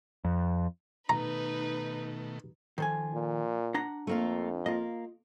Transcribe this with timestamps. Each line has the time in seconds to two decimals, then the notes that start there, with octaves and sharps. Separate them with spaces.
0.24 F2
1.09 B2 D#3 A3 D#4 B4 A#5
2.78 D#3 F3 A4 G#5
3.14 A#2
3.74 D4 F#5 A#5
4.07 F2 A3 A#3 F4
4.66 A#3 F4 D#5